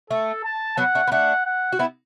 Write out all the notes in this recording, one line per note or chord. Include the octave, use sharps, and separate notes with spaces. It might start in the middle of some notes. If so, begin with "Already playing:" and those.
A3 A4
A5
F#3 B3 F#5
A3 D4
B3
A3 D4 F#5
F#5
F#4
B3 E4